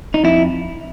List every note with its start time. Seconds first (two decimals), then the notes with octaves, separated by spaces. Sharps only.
0.14 D#4
0.24 F2 E4